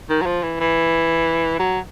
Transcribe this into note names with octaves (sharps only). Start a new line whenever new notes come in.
D#3
F#3
F3
E3
E3
F#3